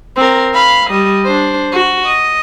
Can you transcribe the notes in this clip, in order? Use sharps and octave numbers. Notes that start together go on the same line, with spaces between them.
C4 A#4
F5 B5
G3 D#5
D4 C5
F#4
D#5